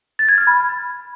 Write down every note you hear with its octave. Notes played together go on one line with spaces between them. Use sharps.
A6
G#6
F6
B5